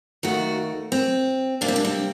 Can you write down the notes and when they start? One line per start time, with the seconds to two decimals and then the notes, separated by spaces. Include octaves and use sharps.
0.23 D#2 D#3 A3 F#4
0.92 C4
1.61 C3 G3 A#3 D4
1.68 C4
1.76 D4
1.85 C4